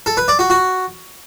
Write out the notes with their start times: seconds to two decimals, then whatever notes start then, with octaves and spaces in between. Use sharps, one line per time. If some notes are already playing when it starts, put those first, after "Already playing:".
0.06 A4
0.17 B4
0.28 D5
0.39 F#4
0.50 F#4